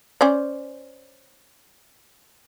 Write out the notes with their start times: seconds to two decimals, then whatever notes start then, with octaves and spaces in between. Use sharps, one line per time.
0.21 C#4 C5 D5